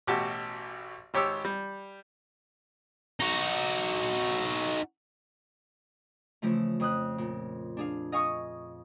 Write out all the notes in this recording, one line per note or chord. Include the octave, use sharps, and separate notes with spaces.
A1 B2 F#4 G4 A5
G#1 G4 C#5 D6 E6
G3
D#4 F#4
C#3 E3 F3 A3
F2 D#6 F#6
A#2
D4 G#4 F5
D#5 F5 G#5 C#6 D#6